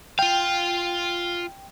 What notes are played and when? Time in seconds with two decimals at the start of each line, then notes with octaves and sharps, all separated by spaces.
0.19 F4 F5 G5